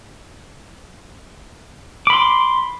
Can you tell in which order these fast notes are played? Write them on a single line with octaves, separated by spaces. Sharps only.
D6 B5 C6